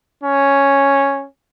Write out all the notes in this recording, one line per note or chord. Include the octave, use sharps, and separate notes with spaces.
C#4